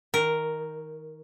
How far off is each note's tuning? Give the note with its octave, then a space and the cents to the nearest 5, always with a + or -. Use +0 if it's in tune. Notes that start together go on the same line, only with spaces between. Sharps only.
D#3 +20 A#4 +0